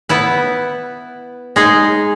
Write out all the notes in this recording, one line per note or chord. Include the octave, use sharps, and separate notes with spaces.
B3 E4 B4
G#3 D#4 G#4